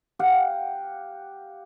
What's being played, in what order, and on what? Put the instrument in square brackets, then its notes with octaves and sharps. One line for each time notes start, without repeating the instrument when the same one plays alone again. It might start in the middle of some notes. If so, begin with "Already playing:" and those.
[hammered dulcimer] G4 F5 F#5